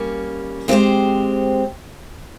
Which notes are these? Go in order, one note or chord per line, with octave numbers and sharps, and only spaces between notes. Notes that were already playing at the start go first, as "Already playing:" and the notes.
Already playing: G3 A#3 C#4
G#3 C4 E4 G4 C5